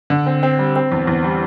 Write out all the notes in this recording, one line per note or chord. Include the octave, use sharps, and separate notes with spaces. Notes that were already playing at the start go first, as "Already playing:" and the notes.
D3
C4
C4
G3
C4
E2
E2
G3